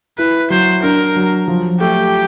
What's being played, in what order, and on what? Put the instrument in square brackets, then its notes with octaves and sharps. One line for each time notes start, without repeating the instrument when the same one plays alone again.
[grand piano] E4 [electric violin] B4
[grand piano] F#3 [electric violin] C5
[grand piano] D4 [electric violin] A#4
[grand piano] F#3
F3
[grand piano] A3 [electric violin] G4